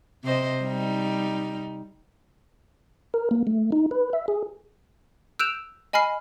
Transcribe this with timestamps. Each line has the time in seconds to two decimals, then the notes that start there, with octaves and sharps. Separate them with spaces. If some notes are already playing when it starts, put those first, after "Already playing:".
0.24 C3 C5 D#5
0.62 G3 D#4
3.14 A#4
3.31 A#3
3.47 A3
3.72 D#4
3.91 B4
4.13 E5
4.28 G#4
5.39 E6 F#6 G6 D7 E7 F7
5.93 D#5 G#5 B5 F6 C7